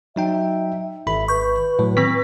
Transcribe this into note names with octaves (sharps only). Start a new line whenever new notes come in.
F#3 D#4 E5 G5
G#1 E5 B5
B4 C#6 G6
A2 F#3
D#3 C4 B6